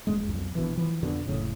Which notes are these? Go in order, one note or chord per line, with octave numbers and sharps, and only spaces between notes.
D#1 F#2 G#3
B1 F2
A#1 B2 E3
E3 F3
F2 B2 D3
F#1 F2 A2 C#3